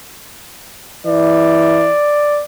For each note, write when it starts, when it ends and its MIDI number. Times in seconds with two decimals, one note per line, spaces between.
1.07 1.91 52
1.07 2.44 74